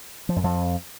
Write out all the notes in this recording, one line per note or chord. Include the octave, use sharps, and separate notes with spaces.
F3
F#2
F2